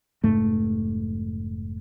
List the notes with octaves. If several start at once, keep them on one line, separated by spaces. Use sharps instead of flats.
F1 G#2 A3